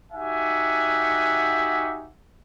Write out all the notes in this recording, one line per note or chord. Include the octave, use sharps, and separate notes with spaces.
D#4 F#4 G4 E5 F#5 G#5